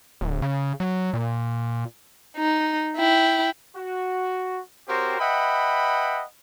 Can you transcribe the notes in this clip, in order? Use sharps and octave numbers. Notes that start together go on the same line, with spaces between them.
D1
C#3
F#3
A#2
D#4
E4 G5
F#4
C4 F#4 G4 A#4 C5 C#5
B4 D#5 E5 F#5 G5 B5